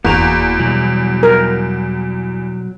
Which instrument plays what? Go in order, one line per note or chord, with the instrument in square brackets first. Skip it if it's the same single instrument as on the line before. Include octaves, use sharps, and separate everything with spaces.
[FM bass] F1 [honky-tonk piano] E2 [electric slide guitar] A#3 F#4 A#5
[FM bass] B2 [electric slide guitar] F#3 G3 E4
[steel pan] A#4